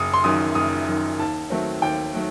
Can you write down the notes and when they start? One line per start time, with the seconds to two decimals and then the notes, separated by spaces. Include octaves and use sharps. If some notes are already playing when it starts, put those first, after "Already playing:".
Already playing: F#1 D#6
0.14 C6
0.24 F#2 D#3 D#6
0.55 F#1 D#6
0.87 F#2 D#3
1.19 D#2 A5
1.50 D#3 F#3 A3 C4
1.82 D#2 G5
2.14 D#3 F#3 A3